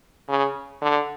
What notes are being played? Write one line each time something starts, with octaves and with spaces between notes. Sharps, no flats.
C#3
D3